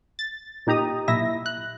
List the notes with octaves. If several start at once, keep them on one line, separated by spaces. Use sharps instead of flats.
A6
A#2 D#4 G4 A#5 D#6
B1 A#2 E4 E5 A#6
F#6